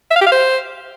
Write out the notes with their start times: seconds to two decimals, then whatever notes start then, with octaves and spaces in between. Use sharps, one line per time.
0.11 E5
0.16 F5
0.21 G4
0.27 F5
0.32 C5